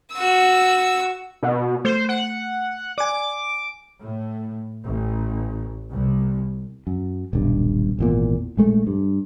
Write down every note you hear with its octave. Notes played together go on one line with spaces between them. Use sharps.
F#4 E6
B2
A3 C5
F#5
D5 G#5 D6
A2
A1
C2
F#2
D#1 B1 G2
G#1 E2 A#2
A#1 G#3 A3
G2